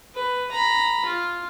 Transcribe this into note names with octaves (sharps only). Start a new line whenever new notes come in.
B4
A#5 B5
F4